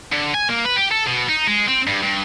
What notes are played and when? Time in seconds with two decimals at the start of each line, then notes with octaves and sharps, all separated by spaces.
0.13 D3
0.34 G#5
0.48 A#3
0.65 B4
0.76 G4
0.91 A4
1.07 B2
1.29 D#4
1.47 G#3
1.68 C4
1.87 G2
2.03 G2